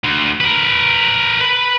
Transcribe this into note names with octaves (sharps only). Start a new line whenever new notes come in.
D2
A#4 B4
B4 B5